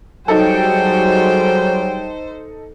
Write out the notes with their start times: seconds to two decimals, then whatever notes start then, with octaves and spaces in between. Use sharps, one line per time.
0.28 F#3 G3 D#4 G#4 A4 C5 G5